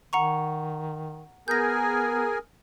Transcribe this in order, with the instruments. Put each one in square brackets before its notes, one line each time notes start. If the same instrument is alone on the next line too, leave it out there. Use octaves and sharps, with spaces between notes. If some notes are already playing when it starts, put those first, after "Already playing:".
[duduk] D#3 [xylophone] F#5 A#5 C#6
[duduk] B3 [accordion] G#4 A#4 G#5 [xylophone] G6 A#6